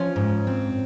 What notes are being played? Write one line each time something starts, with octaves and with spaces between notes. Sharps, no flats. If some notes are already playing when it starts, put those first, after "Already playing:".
Already playing: F3 C#4 F4
G#2
C4